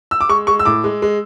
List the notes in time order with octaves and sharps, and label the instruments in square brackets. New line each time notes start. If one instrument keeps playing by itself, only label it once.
[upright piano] E6
D6
G#3 C#6
G#3 C#6
E6
A2 D6
G#3
G#3